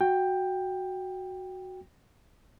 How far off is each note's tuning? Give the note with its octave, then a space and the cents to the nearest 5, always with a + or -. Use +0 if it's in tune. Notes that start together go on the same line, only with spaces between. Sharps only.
F#4 +0 G5 +10